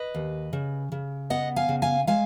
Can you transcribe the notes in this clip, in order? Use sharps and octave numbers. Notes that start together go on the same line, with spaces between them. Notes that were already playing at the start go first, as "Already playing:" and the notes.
Already playing: B4 D#5
D#2
C#3
C#3
B3 D#5 F#5
F5 G#5
C#3
F5 G#5
G#3 F5 G#5